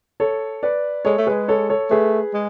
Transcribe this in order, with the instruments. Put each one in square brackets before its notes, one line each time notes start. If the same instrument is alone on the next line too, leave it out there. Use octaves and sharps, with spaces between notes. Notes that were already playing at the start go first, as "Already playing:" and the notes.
[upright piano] A4 C#5
B4 D5
[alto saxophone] G#3 [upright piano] A4 C#5
[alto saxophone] A3
[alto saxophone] G#3 [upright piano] G#4 B4
[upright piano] A4 C#5
A4 C#5
[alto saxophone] A3 [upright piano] G#4 B4
[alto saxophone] G#3